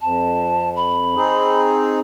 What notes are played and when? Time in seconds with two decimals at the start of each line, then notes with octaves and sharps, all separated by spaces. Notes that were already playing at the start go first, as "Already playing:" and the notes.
0.01 F2 A5
0.76 B5
1.16 C4 D#4 G#4